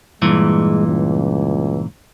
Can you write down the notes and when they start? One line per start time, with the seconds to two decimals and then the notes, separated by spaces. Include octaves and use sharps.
0.22 G2 A#2 E3 G#3
0.87 C#2